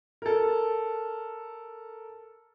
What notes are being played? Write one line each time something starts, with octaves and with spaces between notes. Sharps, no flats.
A4 A#4